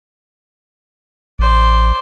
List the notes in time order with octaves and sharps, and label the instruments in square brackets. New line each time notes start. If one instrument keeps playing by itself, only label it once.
[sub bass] A1 [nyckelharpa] C5 D5